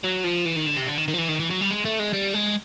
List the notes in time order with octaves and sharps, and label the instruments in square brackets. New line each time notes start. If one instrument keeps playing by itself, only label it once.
[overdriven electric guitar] F#3
F3
E3
D#3
D3
C3
D3
D#3
D#3
F3
E3
D#3
E3
F#3
G3
G#3
A3
G#3
G3
G#3